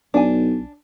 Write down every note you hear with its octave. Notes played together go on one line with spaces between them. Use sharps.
B1 D4 G#5